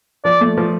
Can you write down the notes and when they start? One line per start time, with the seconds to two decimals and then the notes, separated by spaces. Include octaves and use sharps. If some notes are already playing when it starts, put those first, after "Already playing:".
0.25 F3 D5
0.41 A3
0.57 F3